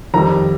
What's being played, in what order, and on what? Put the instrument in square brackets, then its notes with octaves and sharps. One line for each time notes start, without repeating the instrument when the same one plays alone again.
[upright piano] F2 D#3 G3 A#5